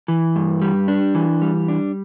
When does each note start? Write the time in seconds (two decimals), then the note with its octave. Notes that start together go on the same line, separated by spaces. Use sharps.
0.08 E3
0.36 G2
0.62 G3
0.88 D4
1.15 E3
1.42 G3
1.68 D4